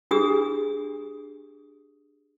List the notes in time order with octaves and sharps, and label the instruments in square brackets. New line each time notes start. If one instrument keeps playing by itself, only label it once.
[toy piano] D4 G4 G#4 D#6